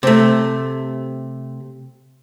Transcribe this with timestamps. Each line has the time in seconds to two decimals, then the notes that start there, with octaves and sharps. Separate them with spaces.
0.03 C3 A3